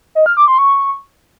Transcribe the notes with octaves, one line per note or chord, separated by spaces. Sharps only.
D#5
F6
D6
C6
C#6